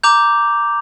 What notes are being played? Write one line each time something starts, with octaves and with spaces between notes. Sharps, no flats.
A#5 D6 G6 F7